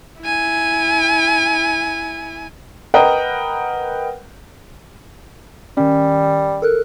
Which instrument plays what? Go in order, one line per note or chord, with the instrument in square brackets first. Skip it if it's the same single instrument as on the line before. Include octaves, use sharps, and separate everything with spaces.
[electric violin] E4 G#5
[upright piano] A#4 B4 D#5 F#5 G5 A#5
[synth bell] D#3 C#4 [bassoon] G3
[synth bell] A4 A#4 F#6